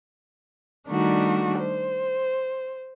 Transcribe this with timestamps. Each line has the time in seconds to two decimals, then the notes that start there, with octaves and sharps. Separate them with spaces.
0.87 D#3 G3 A3 D4 D#4 F#4
1.59 C5